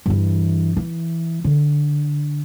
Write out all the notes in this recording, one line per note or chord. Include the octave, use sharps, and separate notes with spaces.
G2 E3
E3
D3